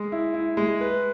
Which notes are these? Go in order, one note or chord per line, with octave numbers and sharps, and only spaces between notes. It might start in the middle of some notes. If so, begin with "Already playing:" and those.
Already playing: G#3
E4
E4
G#3
B4